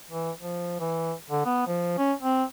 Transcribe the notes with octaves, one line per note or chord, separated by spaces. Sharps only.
E3
F3
E3
D3
B3
F3
C#4
C4